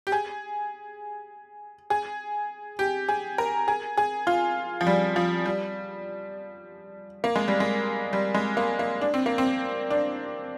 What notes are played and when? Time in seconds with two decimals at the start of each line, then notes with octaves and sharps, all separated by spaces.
0.07 G4
0.12 G#4
1.90 G#4
2.79 G4
3.09 G#4
3.38 A#4
3.68 G#4
3.97 G#4
4.27 F4
4.81 F3
4.87 G3
5.16 F3
5.46 G3
7.24 A#3
7.36 G#3
7.48 G3
7.60 G#3
8.13 G3
8.34 G#3
8.57 A#3
8.79 A#3
9.01 D4
9.14 C4
9.26 A#3
9.38 C4
9.91 D4